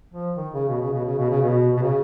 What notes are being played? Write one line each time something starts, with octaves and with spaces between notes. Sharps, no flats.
F3
D#3
C#3
B2
C#3
B2
C#3
B2
C#3
B2
B2
C#3